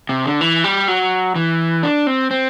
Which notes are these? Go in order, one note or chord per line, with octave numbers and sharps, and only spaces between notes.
C3
D3
E3
G3
F#3
E3
D4
C4
C4